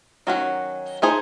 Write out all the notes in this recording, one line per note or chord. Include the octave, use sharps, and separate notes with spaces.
D#3 F#3 C#4 F#4
A3 D#4 G#4 C5